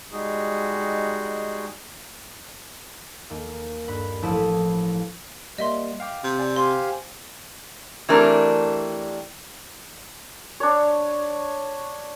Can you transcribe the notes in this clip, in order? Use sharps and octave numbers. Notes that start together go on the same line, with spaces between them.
G3 G#3 D#4 F#4 G#4
D#2 A#3
G2 B4 B5
A1 F3 E4 A5 D#6 E6
G3 A#3 D#5 E5 C6
F5 G5 D6
C3
D5 G#5
G4 C5 F5 G#5 C6
E3 G3 A3 C4 D4 A#4
D4 C#5